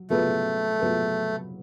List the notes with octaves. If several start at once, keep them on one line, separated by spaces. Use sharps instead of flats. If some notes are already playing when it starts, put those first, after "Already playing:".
Already playing: F#3
F#3 A3 B3 F4 G#4 B4
F#3 B3 F4 G#4 B4